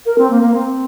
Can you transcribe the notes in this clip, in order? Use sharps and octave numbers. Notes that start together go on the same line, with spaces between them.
A#4
C4
A#3
A#3
C4